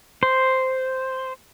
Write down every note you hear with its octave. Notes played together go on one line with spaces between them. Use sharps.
C5